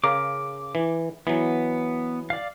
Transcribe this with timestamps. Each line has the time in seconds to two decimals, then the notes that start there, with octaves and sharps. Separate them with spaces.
0.04 C#3 A#4 F5 D6
0.75 E3
1.27 E3 F#3 B3
2.30 D5 F5